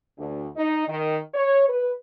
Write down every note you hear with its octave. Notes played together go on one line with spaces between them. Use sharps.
D2
D#4
D#3
C#5
B4